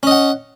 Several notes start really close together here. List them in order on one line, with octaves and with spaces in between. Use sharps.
C#4 D#5 F#5